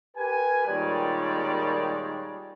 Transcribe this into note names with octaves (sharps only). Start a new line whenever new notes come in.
G4 A#4 B4 G#5
A#2 D#3 G3 G#3 C#5 D5